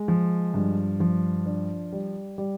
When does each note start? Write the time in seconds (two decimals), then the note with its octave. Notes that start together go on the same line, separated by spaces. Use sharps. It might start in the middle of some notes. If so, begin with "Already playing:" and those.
Already playing: G#3
0.08 F3
0.54 G2
1.00 F3
1.46 D4
1.92 G3
2.38 G3